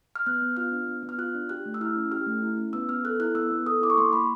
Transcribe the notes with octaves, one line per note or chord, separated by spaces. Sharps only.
F6
B3 F#6
B3
F4 F6
D4
B3
B3
F6
F4 F#6
D4
G4 F#6
A3
E6
E4 F6
C#4
G4 F6
A3
E4
C#4
B3 E6
B3 F6
A4 F#6
E4 F#6
B3 E6
B3
A4 D#6
E4 D6
C#6
A#3 C6
A#3 B5